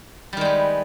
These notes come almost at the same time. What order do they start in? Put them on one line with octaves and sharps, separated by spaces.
G3 D#3 G#3 B3